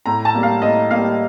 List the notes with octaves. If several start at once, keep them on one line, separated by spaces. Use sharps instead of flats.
A2 A#5
A5
G3 A#3
F5
A2 D#5
G3 A#3 F5